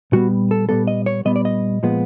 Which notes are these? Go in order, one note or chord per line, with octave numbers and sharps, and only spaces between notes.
A#2 G3 B3 F#4
A4
A#2 G3 B3 A4
D#5
C#5
A#2 G3 B3 D#5
D5
D#5
A#2 F3 G#3 B3